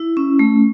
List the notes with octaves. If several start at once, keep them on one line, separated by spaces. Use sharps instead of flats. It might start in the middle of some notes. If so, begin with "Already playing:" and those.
Already playing: E4
C#4
A3